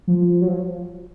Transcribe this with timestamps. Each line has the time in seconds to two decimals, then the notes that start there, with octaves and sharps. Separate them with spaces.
0.07 F3
0.41 F#3
0.48 F3